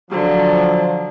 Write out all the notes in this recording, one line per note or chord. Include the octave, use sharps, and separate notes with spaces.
D3 F3 F#3